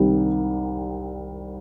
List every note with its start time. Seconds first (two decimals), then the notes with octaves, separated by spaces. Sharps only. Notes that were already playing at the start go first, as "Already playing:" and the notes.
Already playing: C2 C3 D#3 G3 C4